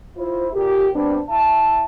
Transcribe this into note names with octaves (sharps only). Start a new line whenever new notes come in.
E4 F4 C5
A#2 G4
G3 B3 C4 D4
E4 E5 A5